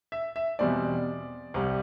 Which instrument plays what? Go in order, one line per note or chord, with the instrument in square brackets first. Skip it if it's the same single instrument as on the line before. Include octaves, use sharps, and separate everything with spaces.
[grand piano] E5
E5
E2 B2 G3 C4 D5
C2 C3 G3